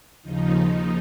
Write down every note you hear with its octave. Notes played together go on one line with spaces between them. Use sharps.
D#2 C#3 F3 D#4